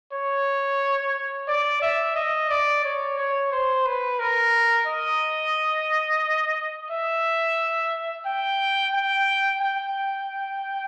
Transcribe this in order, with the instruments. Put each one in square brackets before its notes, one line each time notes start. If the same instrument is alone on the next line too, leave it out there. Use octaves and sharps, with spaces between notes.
[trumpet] C#5
D5
E5
D#5
D5
C#5
C#5
C5
B4
A#4
D#5
E5
G5
G5
G5